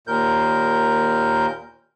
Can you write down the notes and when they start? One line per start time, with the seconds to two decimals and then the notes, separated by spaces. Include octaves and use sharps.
0.07 D#2 A#2 A#4 G6